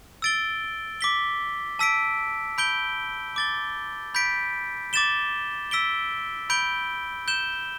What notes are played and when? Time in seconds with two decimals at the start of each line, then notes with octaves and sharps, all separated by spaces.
0.22 E6 A6 D7 G7
1.01 D6 B6 G7
1.79 A5 E6 B6 D7
2.58 B5 G6 D7 G7
3.36 D6 A6 G7
4.14 B5 G6 B6 D7
4.93 D6 A6 E7 G7
5.71 E6 B6 D7 G7
6.50 B5 G6 D7 G7
7.28 G6 E7 G7